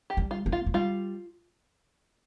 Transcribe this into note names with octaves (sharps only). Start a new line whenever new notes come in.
G4
G3
F4
A#3
F4
A#3
G3 F4